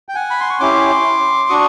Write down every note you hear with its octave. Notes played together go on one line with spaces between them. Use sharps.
G5
F#5 G#5
B5
C6
C#6
C#4 E4 G4 C6 D6
D4 F#4 C#6 D#6